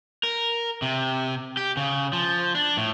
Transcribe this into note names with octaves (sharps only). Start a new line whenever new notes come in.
A#4
C3
G4
C#3
F3
D4
A2